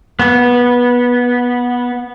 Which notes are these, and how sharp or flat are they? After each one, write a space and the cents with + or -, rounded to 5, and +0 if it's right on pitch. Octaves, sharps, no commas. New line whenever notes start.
B3 -15